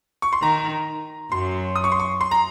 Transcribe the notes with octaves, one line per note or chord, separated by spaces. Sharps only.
C#6
C6
D#3 A#5
F#2 F#3 C6
D#6
C#6
C6
C#6
C6
A#5